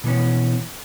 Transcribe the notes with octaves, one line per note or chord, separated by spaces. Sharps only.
B2 E3 B3 C#4